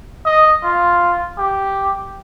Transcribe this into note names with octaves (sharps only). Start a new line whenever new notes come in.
D#5
F4
G4